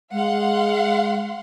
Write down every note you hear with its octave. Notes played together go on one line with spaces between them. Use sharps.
G#3 F5 F#5 C6